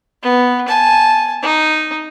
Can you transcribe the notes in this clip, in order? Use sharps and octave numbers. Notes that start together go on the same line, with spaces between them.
B3
G#5 A5
D#4